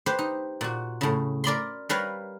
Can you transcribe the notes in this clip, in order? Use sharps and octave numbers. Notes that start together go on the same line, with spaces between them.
G4 B4 C5
D#4
A#2 F#4
A2 C#3
A#4 D5 B5 C6
G3 A#4 B4 C#5 F5